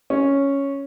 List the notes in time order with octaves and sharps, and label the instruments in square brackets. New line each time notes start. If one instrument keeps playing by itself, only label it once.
[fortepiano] C#4